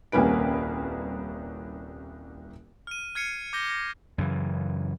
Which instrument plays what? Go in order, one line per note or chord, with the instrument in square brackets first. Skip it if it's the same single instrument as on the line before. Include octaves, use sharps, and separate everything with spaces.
[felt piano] D#1 C2 A#3 C#4 B4 D7
[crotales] F6 D#7
F6 G#6 C7 C#7 D#7
D6 G6 A#6 G7
A#6
[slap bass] F#2 C#3 E3